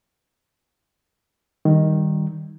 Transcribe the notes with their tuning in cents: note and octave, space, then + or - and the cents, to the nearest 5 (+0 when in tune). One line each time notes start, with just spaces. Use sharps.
D#3 +0 G3 +0